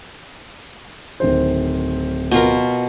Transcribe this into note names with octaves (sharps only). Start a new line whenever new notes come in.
D1 D#3 C5
B2 F4 A#4